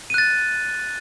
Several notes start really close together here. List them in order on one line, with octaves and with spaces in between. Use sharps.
D#7 F#6 A6